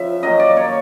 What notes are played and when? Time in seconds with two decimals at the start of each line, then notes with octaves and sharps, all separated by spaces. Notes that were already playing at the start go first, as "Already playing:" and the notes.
Already playing: C#3 F3 E5
0.23 F#2 D#3 F#3 A#3 D#5
0.40 D5
0.57 C#5